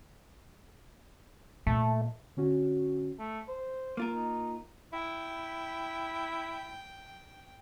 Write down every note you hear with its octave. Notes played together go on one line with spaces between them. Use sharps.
A#2 A3
D3 C#4 F#4
A3
C5
A#3 F4 A#4
D#4
E4 G5